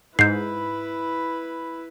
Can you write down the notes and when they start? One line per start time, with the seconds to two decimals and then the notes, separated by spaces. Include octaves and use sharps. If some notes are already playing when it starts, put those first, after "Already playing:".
0.19 G#2 E4 B4 G6 C7